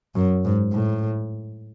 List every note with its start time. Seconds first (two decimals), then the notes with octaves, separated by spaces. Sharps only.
0.15 F#2
0.45 G#2
0.72 A2